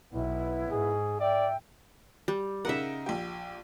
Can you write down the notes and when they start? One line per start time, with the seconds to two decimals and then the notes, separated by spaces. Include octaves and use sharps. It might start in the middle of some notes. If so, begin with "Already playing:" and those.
0.13 B1 B3 E4
0.71 G#2 G#4
1.20 D5 E5 G5
2.28 G3
2.65 C#3 D#4 A#4 E5 F#5
3.06 A#1 G4